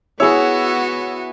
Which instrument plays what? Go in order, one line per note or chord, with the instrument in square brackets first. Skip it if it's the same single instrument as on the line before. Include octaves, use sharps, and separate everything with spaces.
[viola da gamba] B3 F#4 [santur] E4 G#4 [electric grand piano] C#5 E6